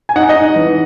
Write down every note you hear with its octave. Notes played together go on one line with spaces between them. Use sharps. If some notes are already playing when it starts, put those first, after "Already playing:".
G#5
D#4 F#5
D#5
D#4
E3